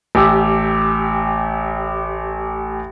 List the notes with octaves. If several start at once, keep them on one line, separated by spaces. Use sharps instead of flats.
A1 G4 E6